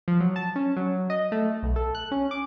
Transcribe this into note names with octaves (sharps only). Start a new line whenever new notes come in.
F3
F#3
A5
C#4
F#3
D#5
A3
B1
A4
F#6
C#4
D6